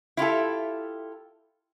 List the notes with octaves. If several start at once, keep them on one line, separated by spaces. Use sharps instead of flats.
E4 F4 G4 A4